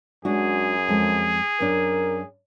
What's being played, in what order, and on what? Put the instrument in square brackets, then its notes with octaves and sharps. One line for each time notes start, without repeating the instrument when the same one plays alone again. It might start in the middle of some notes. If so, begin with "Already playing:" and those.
[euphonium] F#2 [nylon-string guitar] G#3 D4 F#4 [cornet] G#4
[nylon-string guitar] F2 G#3
[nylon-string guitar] F#2 D4 [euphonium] A#4